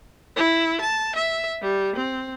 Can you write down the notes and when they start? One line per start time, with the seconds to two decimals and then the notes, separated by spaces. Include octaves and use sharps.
0.36 E4
0.81 A5
1.16 E5
1.62 G3
1.95 C4